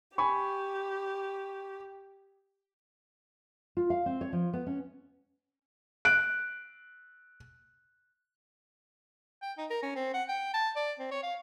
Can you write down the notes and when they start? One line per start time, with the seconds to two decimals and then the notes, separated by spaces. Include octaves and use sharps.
0.18 G4 G#5 B5 C#6
3.77 F4
3.90 F5
4.06 C4
4.21 C#5
4.33 F3
4.53 B3
4.67 C#4
6.05 F#6 D7
9.42 G5
9.58 D#4
9.70 A#4
9.83 C#4
9.96 C4
10.14 F#5
10.29 G5
10.54 A5
10.76 D5
10.99 C4
11.11 C#5
11.23 F5